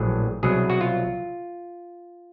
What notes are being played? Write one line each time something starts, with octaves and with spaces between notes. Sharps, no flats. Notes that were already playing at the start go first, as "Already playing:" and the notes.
Already playing: A#1 A2 F#3 G#4
C2 B2 F#3 G#4
F#4
F4